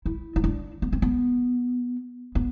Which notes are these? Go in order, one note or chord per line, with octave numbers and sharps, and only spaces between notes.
E4
E4
D4
B3
C4
B3
B3